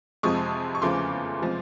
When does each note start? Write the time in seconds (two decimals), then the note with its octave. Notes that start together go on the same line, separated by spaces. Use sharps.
0.23 F2 C3 F3 G#3 C#6 D#6
0.75 C#6
0.82 E2 C#3 F3 A3 C6 D6
1.42 C3 F3 G#3